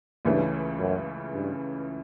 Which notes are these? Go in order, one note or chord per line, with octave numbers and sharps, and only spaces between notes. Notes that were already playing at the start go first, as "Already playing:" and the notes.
C#2 G2 C#3 E3 A3 C#4
F#2
G2